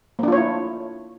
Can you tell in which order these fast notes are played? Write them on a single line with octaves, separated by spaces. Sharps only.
A#3 D4 F4 C#5 E4